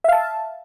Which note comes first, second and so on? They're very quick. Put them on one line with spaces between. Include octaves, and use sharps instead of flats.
E5 F5 A5